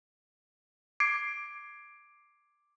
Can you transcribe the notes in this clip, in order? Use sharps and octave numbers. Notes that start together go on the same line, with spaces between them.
D6 G#6 C7 D7